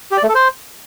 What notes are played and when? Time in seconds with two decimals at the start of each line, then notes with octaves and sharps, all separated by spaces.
0.11 G4
0.17 D5
0.23 A3
0.29 A4
0.35 C5